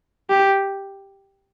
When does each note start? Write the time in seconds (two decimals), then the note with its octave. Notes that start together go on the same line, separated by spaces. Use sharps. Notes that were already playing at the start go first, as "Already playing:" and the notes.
0.30 G4